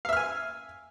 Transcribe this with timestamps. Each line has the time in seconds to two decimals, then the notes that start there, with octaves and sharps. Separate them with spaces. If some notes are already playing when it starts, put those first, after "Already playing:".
0.05 F5
0.09 E5
0.13 F6
0.17 G#5